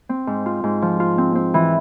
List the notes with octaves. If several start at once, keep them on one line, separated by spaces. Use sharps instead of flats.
C4
G#2
F4
G#2
F3
F4
C4
C4
E3